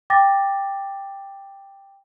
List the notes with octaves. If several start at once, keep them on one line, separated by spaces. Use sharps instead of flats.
G5 D6 A6 A#6